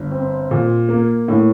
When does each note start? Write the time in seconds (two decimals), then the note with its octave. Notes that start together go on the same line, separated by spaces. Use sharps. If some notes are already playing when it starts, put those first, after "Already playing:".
Already playing: G1
0.11 C4
0.51 A#2
0.89 A#3
1.28 A2